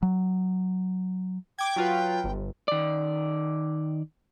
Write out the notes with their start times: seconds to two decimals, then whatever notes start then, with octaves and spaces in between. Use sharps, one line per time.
0.03 F#3
1.59 G5 D6 G#6
1.76 F#3 F4 B4
2.24 G1
2.68 D#3 D5